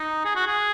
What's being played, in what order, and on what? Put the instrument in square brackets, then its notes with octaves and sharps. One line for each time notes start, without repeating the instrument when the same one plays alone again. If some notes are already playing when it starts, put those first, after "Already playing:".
Already playing: [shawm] D#4
G#4
F#4
G#4